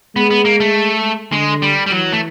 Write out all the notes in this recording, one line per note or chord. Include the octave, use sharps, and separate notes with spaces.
G#3 B3
B3
A#3
A3
D3 G#3
G3
G3
E3 F#3
A3